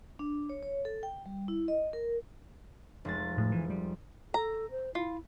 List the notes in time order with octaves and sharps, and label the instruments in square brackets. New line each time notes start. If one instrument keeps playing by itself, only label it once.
[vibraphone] D4
C#5
C#5
A4
G5
G3
E4
D#5
A#4
[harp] F1 G#3 A6
[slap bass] A2
E3
G3
[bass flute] A4 [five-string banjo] A#5
[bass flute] C5
[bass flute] E4 [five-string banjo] F4